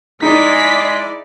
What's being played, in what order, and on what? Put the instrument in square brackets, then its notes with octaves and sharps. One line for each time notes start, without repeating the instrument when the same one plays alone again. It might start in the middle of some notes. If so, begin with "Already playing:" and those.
[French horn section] G#3 [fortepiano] D#4 [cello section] E4 D5 [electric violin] B6